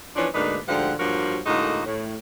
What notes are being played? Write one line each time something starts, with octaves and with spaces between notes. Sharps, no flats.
E3 F3 B3 C#4 D4
D2 G#2 A#3 D4 D#4 B4
D2 G#2 D3 F3 G4 F#5
G2 F3 F#3 A#3 F#4 A#4
A2 D3 G#3 A#3 D#4 F#4
A2